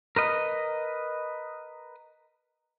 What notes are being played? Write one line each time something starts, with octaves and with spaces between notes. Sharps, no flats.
A#4 B4 D#5